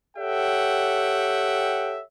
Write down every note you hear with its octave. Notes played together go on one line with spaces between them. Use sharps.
G4 A4 C#5 E5 F#5 G5